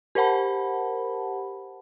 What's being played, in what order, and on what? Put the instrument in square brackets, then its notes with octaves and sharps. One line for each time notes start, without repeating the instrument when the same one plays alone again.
[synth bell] G4 A#4 C5 F#5 A5 B5